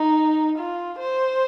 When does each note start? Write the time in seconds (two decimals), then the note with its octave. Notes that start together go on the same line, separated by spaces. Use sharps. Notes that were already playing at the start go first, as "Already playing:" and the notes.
Already playing: D#4
0.58 F4
0.99 C5